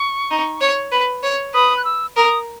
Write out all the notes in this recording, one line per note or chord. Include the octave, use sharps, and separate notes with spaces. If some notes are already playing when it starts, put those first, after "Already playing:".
Already playing: C#6
D#4
C#5
B4
C#5
B4 D#6
F#6
E6
A#4 D#6